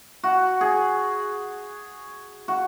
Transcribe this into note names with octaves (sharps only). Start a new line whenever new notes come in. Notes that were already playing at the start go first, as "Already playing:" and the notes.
F#4
G#4
F#4